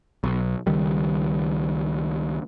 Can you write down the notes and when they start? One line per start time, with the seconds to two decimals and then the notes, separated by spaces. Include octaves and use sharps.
0.24 B1
0.67 C#2 D#3 G3